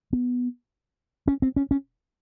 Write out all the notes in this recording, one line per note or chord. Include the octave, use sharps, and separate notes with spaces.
B3
C#4
C4
C#4
C#4